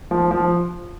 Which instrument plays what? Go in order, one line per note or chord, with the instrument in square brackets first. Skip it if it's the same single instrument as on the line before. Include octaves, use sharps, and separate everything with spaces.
[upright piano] F3
F3